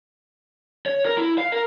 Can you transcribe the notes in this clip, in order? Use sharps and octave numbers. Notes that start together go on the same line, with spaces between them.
C#5
A#4
E4
F5
A#4